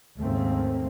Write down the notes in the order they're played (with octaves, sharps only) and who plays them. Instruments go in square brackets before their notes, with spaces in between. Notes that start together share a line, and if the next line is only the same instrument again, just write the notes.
[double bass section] D#2 G#2 C#3 A3 A#3 C4